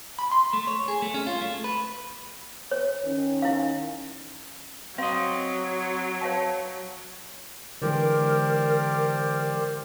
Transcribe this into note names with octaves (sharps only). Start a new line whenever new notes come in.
B5
C6
A3
C#5
G#4
A3
C#4
F4
A3
B4
C#5
D#3 C#4
E4 F5
F#3 C4 D#5 F5
C#5 F5 A5
D3 E3 G#3 G4 A#4 C5 D5